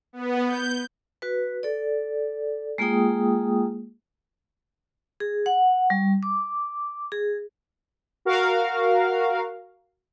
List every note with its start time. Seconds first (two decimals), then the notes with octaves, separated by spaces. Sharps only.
0.13 B3
0.46 G6
1.22 F#4 B4
1.63 A4 D5
2.78 G#3 A#3 F4 G#4 G5 D#6
5.20 G#4
5.46 F#5
5.90 G3
6.23 D6
7.12 G#4
8.25 F#4 A#4 F5